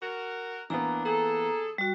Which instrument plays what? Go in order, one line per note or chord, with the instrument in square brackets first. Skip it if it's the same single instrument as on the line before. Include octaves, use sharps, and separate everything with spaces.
[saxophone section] F#4 A#4
[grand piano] E3 A#3 B3 [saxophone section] D4 [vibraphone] A#5
[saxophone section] G#4 A4 [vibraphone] A#5
[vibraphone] G3 F#4